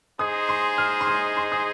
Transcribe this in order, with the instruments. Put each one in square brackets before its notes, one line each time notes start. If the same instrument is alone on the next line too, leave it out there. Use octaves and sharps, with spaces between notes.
[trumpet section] D#4 G#4 C5 D#5 [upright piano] D#6
[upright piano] C6
F6
C6
D#6
C6
D#6